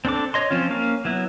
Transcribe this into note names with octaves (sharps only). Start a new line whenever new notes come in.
C4 D4 A4 D6
C#5 D#5 C6
F3 C4 C#4 F4
A#3 C#4 F5
F#3 B3 E4